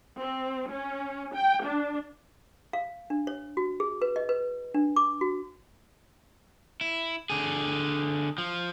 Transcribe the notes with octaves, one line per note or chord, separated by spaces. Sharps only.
C4
C#4
G5
D4
F5
D4
C#5
F#4
G#4
B4
D#5
B4
D4
D6
F#4
E4
D3 G#4
F3